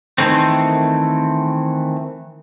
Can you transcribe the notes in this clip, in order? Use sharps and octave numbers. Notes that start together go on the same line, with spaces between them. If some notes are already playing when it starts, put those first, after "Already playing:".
D#3 E3 A3 C4